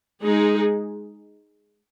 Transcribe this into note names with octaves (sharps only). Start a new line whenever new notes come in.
G#3 D#4 G#4